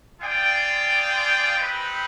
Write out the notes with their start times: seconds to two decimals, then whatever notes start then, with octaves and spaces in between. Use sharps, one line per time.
0.21 F4 G#4 D5 G5
1.57 C4 D#4 G4 B4